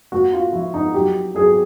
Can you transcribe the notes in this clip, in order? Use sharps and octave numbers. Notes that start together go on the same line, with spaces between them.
A#3 F#4
F4
F3 E4
D#4
F#3 G4
F#3 G#4